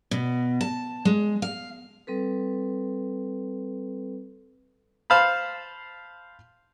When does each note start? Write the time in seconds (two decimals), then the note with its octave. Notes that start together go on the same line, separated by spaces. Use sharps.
0.11 B2
0.61 A5
1.05 G#3
1.42 F5
2.07 G3 C4 A4 B4
5.10 C5 F5 A5 B5